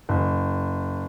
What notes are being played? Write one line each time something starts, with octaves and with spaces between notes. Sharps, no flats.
F#1